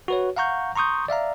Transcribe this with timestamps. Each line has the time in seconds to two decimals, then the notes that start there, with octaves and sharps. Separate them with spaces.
0.08 F#4 B4 C#5
0.36 F5 F#5 A#5 C#6 G6
0.76 A#5 C6 C#6 D#6 G6
1.08 D5 E5 F5 A#5